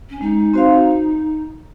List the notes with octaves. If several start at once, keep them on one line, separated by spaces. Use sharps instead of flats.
C#4
G#3 D#4
C4 F#4 C5 F5